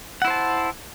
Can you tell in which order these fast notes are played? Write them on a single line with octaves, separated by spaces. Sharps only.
F#5 E4 C5 A5